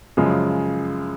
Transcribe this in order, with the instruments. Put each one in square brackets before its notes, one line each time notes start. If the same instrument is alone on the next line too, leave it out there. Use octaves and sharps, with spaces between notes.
[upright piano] F#2 C#3 F3 G#3